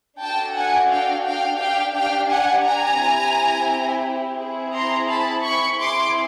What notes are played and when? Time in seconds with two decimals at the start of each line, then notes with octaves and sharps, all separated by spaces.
0.20 D4 F#4 A4 G5 A5
0.55 F#5 G#5
0.90 F5 G5
1.25 F5 G5
1.59 D4 G4 F5 G5
1.94 F5 G5
2.30 F#5 G#5
2.64 G#5 A#5
2.99 C4 E4 G4
4.38 C4 E4 G#4
4.73 A#5 C6
5.08 A5 B5
5.43 B5 C#6
5.78 C4 E4 G#4 C6 D6